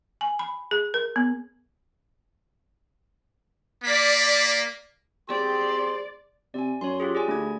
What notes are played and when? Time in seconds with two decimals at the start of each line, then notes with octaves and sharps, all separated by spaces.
0.21 G#5
0.39 B5
0.71 G#4
0.94 A#4
1.16 B3
3.83 A#3 D5 B6
5.29 C4 G4 G#4 C5 D5 C6
6.54 C3 D5 G#5
6.81 F#2 C#5 C6
7.00 F4 G4 G#4
7.15 G#4 D5 G#5
7.28 D2 A3 G#6